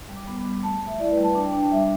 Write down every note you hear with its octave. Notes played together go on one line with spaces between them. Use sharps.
G3
D6
B3 B5
G3
A3 A5
A3
E5
E4 D5
B4
G3
A5
D4 G5
D4
G3 E5